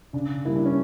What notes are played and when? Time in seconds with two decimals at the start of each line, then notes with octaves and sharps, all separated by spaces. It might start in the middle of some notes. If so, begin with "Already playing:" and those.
0.13 C#3 D4
0.45 G3 A#3 E4
0.56 D4
0.66 C#4